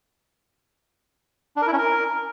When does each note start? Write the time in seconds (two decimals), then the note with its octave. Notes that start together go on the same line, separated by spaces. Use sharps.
1.56 D4
1.62 A#4
1.67 E4
1.73 C#4
1.78 A#4